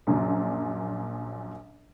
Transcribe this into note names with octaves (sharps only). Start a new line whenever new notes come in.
A#1 F#2 A#2 F#3